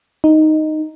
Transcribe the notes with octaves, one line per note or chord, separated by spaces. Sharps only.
D#4